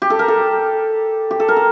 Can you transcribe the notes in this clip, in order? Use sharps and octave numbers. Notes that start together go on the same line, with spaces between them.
G4
A4
A#4
A4
G4
A4
A#4
A4